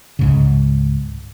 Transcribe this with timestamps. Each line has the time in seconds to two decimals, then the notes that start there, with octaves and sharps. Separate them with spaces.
0.19 C#2 G#2 C#3